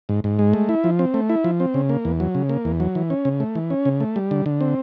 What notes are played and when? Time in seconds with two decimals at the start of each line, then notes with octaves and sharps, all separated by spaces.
0.09 G#2
0.24 G#2
0.39 G#3
0.53 A3
0.69 E4
0.84 F3
0.99 C4
1.14 A3
1.29 E4
1.44 F3
1.60 C4
1.74 C#3
1.89 A#3
2.05 E2
2.20 F#3
2.35 C#3
2.49 A#3
2.65 E2
2.80 F#3
2.95 E3
3.10 C#4
3.25 C#3
3.40 A3
3.55 E3
3.70 C#4
3.85 C#3
4.00 A3
4.16 G3
4.31 D3
4.46 D3
4.61 C4